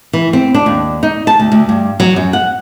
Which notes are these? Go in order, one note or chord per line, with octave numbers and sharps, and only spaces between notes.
E3
C4
D4
D#2
D#4
A5
D2
D2
G2
F#3
F#2
F#5